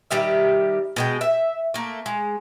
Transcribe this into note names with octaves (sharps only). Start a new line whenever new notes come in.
D#3 G3 G4 E5
B2 G#3 G5
E5
A3 A#3
G#3